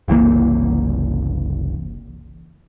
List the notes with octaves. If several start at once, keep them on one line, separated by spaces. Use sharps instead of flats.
F#1 C2 E3 A#3